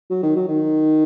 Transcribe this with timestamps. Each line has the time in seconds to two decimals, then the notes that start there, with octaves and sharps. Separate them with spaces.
0.10 F#3
0.23 D#3
0.36 F#3
0.48 D#3